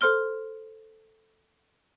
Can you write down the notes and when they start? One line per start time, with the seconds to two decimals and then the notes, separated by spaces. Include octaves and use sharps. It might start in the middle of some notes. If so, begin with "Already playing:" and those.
0.01 A4 C5 C6 F6 G7